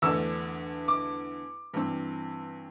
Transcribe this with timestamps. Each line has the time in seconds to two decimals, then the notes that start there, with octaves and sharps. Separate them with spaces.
0.02 E2 D3 A3 D4 E6
0.88 D6
1.74 G2 E3 G3 C4